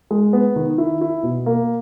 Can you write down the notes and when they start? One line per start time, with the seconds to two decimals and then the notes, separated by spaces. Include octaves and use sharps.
0.11 G#3
0.33 B3
0.56 D#3
0.78 E4
1.01 E4
1.23 B2
1.46 A#3